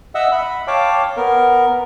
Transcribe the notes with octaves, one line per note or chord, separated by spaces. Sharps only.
D#5 E5 F#5 E6
B5
C#5 F5 G5 A5 D6
B3 A#4